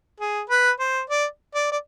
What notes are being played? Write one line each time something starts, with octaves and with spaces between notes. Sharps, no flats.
G#4
B4
C5
D5
D5
D5